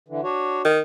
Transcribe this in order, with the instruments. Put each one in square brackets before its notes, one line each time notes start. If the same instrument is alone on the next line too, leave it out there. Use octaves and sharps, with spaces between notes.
[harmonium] D3 E3
D4 F#4 C#5
[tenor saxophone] D#3